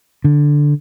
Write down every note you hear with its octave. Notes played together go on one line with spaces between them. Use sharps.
D3